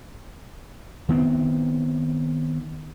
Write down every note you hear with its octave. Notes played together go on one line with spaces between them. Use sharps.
D#3 B3 C4